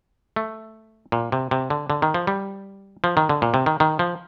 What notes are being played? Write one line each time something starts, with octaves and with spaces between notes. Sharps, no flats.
A3
A#2
C3
C3
D3
D3
D#3
F3
G3
F3
D#3
D3
A#2
C3
D#3
D#3
F3